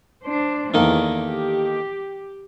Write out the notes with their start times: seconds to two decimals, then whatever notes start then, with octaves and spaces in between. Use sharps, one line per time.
0.23 D4 C5
0.74 E2 D#3 A#3 A4
1.19 G4